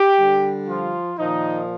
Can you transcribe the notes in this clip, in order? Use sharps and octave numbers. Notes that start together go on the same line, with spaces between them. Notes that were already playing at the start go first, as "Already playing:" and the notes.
Already playing: G4
D3 G3
F3 F4
A#2 D#3 F3 D#4